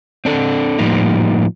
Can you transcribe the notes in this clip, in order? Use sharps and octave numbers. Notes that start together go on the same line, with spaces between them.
C4 D4 A4
A2 F3 G3 A#3 D#4